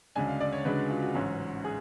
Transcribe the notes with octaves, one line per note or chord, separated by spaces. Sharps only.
D2 C#3 G#3 D4 G#5
F5
D5
C#5
D2 C#3 G#3 D4 B4
F#4
F4
F#4
A1 G#2 F#3 C#4
G#4